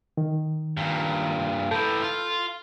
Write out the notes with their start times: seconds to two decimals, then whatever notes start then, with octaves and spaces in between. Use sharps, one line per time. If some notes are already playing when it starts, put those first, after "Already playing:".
0.17 D#3
0.77 G2 A#2
1.71 A2 E3 A4 A5 G6
2.02 F4